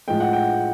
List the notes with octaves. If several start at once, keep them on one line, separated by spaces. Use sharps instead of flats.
A2 F3 G#3 G5
F#5
G5